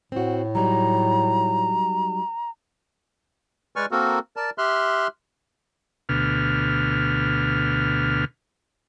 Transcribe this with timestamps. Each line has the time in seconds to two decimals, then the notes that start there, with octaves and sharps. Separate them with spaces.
0.12 A2 C4 F#4
0.55 F#3 G3 D#4 A#5
3.76 G#3 B4 D5 G#5 C#6 F6
3.91 A#3 C4 F#4 A4 A#4
4.36 A#4 D5 A5
4.58 G4 E5 C6 F6 F#6
6.09 D2 B2 F6